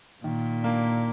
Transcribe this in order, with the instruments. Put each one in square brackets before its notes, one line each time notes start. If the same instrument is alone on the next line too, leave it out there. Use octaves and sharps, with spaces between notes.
[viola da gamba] A#2 [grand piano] D#3
[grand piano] A#3 D4